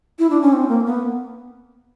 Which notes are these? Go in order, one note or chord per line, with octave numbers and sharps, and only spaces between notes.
E4
D4
C#4
C4
A#3
B3